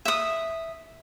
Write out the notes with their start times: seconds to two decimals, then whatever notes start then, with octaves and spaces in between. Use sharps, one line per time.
0.05 E5 D#6